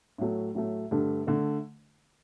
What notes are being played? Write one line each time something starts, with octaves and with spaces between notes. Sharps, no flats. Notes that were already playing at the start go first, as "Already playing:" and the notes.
A2 F#3 A3
A2 F#3 A3
G2 D3 A3
D3 A3